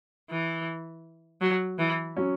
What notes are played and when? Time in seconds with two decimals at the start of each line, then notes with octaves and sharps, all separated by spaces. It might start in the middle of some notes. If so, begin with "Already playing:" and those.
0.30 E3
1.41 F#3
1.78 E3
2.17 F#3 C#4